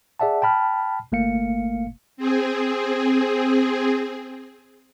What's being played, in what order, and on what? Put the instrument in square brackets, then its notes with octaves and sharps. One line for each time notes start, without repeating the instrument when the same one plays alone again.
[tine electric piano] G#4 D5 E5 F#5 A5
G5 A5 B5 F6
G1 A3 A#3 F5 C#7
[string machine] C4 G#4